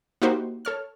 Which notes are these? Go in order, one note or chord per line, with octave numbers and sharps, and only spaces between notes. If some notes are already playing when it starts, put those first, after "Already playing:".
A#3 D#4 E4 F#4 G4 C5
A4 C#5 F6